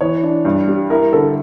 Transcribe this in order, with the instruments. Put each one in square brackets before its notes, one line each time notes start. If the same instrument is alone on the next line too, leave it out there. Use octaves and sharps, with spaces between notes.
[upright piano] E3 [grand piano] C#5
[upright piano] D4
G2
G3
[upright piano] E4 [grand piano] A#4
[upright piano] D3 [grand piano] A4